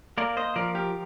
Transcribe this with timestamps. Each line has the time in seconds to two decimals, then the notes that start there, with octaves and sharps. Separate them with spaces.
0.18 A#3 A#4 D5
0.37 C5 D#5
0.56 F3 A#4 D5
0.75 G4 A#4